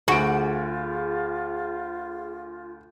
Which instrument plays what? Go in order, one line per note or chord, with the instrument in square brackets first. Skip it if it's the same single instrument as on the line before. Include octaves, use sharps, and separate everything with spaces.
[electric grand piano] D2 D7 [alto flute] F4 [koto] F#4 [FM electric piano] G#4